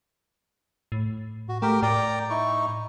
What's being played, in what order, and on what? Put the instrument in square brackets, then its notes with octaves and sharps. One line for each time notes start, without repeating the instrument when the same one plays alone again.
[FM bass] A2
[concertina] F#4
[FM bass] A3 [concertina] G4 A#4 G5
[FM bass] A2 [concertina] D5 G5 A#5
[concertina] D#4 E4 C#6